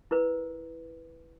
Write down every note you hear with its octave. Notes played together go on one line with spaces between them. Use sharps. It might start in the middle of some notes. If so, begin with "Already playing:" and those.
E4 A#4 B4